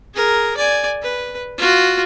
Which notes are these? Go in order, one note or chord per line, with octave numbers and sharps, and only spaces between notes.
G#4 A#4
D5 G#5
B4
F4 F#4